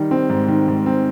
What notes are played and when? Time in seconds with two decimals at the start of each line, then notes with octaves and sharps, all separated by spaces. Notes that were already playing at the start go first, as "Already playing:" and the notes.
Already playing: D#3 G3
0.11 C4
0.29 G#2
0.48 D#3
0.68 G#2
0.86 C4